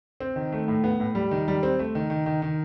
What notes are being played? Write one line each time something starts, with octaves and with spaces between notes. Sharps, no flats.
C4
D#3
A3
A2
B3
A2
G3
D#3
G3
C4
A3
D#3
D#3
D#3
D#3